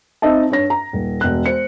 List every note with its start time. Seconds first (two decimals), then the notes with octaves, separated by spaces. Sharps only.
0.22 C4 D#4 D#5 E5 A5
0.50 G2 C#5 A#6
0.70 A#5
0.93 D#1
1.21 E1 F#6
1.46 C5 C#7